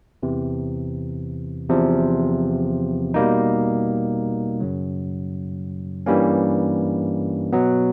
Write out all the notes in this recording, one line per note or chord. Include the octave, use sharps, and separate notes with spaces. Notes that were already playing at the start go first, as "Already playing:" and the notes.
E2 C3 E3
E2 C3 F3
B2 G3 A#3 D#4
F#2 C#3 F#3
G2 E3 G3 A#3 C#4
B2 F#3 B3